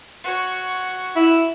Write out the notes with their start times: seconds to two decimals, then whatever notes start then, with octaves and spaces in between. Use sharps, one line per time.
0.23 F#4 C#5
1.16 E4